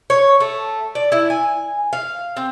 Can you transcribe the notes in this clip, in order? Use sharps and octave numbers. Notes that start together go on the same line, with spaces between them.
C#5
A3
D5
E4
G#5
F5
C4